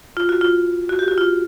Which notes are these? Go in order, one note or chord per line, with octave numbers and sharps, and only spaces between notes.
F4
F#4
F4
F#4
G4
F#4
F4